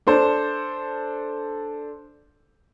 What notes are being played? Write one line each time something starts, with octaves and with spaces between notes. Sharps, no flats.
D4 A4 C5